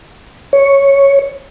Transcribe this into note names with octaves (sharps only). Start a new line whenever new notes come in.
C#5